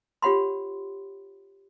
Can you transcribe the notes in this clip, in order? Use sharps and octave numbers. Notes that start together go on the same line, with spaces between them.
F4 G4 C#5 F#5 B5 C6